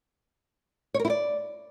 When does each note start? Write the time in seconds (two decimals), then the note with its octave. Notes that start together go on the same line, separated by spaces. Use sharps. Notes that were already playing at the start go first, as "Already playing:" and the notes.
0.94 C#5
1.00 A#4
1.05 E4
1.10 D5